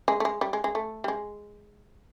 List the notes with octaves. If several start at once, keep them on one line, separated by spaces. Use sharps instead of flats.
G#3
A3
G#3
G3
G#3
G#3
A3
G3
G#3